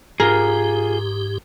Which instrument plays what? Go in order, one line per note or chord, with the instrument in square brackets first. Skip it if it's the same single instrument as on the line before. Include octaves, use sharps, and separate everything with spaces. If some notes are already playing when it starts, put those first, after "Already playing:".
[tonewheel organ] G#2 G4 [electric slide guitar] F4 G#4 [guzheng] A#4